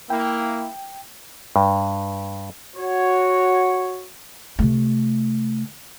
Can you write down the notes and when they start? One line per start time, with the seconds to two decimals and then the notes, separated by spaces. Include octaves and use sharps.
0.10 A#3 E4 G5
1.56 G2
2.75 F#4 C#5
4.59 C3 A3